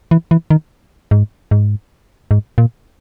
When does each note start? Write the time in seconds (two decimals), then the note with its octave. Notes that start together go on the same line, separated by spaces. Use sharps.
0.11 E3
0.31 E3
0.50 D#3
1.11 G#2
1.51 G#2
2.31 G#2
2.58 A#2